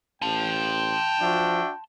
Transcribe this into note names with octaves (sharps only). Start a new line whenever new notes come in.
A1 G5 A5 C6
F3 D4 F#4 E5